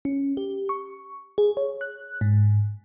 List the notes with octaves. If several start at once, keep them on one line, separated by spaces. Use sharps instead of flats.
C#4
G4
C#6
G#4
C#5
F#6
G#2